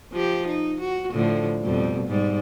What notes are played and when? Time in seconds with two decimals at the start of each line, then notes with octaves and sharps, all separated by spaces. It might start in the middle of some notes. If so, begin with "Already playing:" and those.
0.13 F3 G4
0.47 D#4
0.81 F#4
1.13 A2 D3 F3
1.62 F2 B2 G3
2.08 G#2 G3